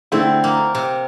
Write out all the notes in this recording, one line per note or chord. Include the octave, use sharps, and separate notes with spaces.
D3 A3 C4 E4
A#3
C3